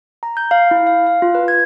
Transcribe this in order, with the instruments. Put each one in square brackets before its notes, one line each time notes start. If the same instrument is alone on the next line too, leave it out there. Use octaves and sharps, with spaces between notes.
[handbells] A#5
G6
F5
E4
F5
F5
F4
B4
G#6